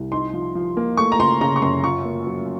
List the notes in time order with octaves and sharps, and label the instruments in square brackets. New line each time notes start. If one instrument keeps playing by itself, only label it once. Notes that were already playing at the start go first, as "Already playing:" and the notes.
Already playing: [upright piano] C2
D#4 C6
F3
F3
A#3
A3 C#6
A#5
C#3 C6
C#3 A#5
C#6
F#2 C6
F4 C#6
A#3
F#3